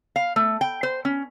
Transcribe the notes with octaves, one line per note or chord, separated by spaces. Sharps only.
F5
A3
G5
C5
C#4